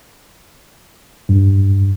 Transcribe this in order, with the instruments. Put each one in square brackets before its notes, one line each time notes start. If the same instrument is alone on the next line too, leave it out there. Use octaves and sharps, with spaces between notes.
[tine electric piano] G2